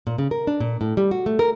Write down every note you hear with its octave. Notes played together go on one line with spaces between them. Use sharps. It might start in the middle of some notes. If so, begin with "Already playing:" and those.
A#2
C#3
A#4
D4
A#2
A2
G3
F#4
A3
A#4